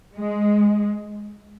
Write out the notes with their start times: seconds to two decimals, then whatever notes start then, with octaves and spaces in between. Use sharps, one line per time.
0.18 G#3